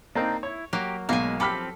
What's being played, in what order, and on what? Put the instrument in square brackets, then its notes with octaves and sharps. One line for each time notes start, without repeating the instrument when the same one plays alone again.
[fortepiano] A#3 C4 D#4 [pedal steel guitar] D4 A#5 G6
[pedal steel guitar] E4 [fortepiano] C#5
[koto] F#3 A#3 [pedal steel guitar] G4
[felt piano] B1 [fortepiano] B2 [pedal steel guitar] G#3 [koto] A#3 G#5
[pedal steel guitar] F3 C4 [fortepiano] G4 B5 F6 [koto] A4 [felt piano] D6 B6